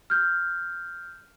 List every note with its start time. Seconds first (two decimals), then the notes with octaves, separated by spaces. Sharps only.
0.10 F6 G6